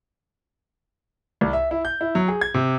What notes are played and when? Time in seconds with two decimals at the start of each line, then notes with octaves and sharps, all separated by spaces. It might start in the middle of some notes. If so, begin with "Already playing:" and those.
1.41 C2
1.53 E5
1.71 E4
1.85 G6
2.01 E4
2.15 F#3
2.28 G#4
2.41 G#6
2.54 C3